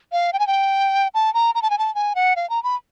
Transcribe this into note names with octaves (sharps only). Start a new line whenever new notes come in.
F5
G5
G#5
G5
A5
A#5
A#5
A5
G#5
A5
G#5
F#5
F5
A#5
B5